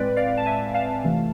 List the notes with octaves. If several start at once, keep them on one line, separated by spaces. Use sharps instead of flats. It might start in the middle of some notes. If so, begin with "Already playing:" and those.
Already playing: A2 G#3 C4 B4 D5
D5 F5
A5
E5 G#5
F5 A5
F2 C3 E3 A3